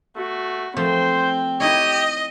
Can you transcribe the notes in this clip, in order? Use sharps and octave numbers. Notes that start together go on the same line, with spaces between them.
A3 F#4
F3 A3 C4 C5 G5
D#4 E4 G4 C#5 D#5